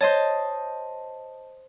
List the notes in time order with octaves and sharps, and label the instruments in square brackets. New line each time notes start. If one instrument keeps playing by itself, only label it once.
[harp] C5 D#5 A5 [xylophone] C#5